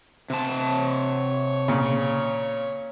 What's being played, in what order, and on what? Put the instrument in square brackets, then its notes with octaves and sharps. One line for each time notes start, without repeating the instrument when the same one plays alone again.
[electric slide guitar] C3 A5
[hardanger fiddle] C#5
[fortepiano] A#2 C#3